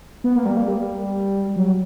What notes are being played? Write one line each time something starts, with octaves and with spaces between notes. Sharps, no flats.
B3
A#3
G3
A#3
G3
F#3